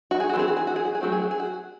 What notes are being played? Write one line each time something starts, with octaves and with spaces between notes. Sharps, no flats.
F#4
G#4
F#4
E3 G#3 C4 G#4
F#4
G#4
F#4
G#4
F#4
G#4
F#3 A3 C4 F#4
G#4
F#4
G#4
F#4